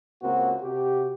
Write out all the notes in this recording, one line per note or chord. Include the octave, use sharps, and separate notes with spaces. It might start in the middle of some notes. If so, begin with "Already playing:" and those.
C#2 A#3 C4 F#4
C3 F#4 G4